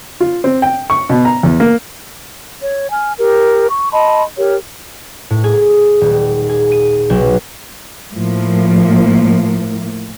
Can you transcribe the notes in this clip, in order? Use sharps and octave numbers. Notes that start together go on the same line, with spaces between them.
F4
C4
G5
C#6
B2
A#5
E2
A#3
C#5
G#5 F6
G4 A#4
C#6
D#5 A5 B5 C6
G4 A#4 C#5
A2
G#4
D#1
G#4
D#7
B1
A2 F3 A#3